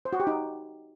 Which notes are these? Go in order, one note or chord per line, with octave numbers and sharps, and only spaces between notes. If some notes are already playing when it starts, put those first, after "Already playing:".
C5
F#4
G4
D#4